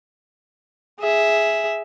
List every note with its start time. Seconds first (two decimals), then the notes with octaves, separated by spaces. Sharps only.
1.00 G#4 E5